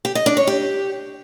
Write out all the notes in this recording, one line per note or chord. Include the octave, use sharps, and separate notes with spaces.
G4
D#5
D4
C#5
G4